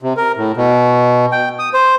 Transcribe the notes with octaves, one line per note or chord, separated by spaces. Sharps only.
C3
A#4
A2
B2
G5
D#6
C5